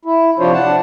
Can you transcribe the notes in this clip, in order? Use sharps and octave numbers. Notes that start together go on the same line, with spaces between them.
E4
C3 F3 D4 F4 C5 C#5
D4 F#5 A5